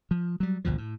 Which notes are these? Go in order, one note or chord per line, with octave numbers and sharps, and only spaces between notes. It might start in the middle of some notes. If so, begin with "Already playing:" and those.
F3
F#3 G3
G#1 D2 B2 F3
A2